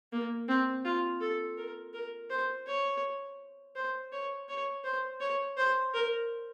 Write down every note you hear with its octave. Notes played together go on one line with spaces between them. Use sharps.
A#3
C4
F4
A4
A#4
A#4
C5
C#5
C5
C#5
C#5
C5
C#5
C5
A#4